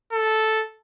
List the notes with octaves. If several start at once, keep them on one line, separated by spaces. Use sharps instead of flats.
A4